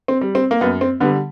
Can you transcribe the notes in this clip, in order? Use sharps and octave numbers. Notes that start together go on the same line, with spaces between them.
C4
G3
C4
A#3
F#2 B3
C4
D3 G3 B3